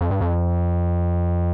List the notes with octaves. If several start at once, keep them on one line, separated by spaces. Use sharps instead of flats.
F2
G2
F2